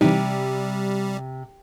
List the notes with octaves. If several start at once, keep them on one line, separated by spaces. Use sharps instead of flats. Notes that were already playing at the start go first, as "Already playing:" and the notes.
C3 E3 G3 C4 D#4